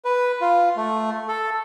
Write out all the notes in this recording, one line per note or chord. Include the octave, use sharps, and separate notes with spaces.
B4
F4
A3
A4